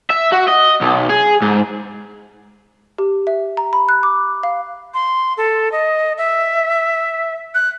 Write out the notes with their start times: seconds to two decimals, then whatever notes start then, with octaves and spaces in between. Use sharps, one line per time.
0.10 E5
0.32 F#4
0.48 D#5
0.81 B1
1.10 G#4
1.42 G#2
2.98 G4
3.27 E5
3.57 A#5
3.73 B5
3.89 F#6
4.03 D6
4.43 F5
4.94 C6
5.37 A4
5.72 D#5
6.18 E5
7.55 F#6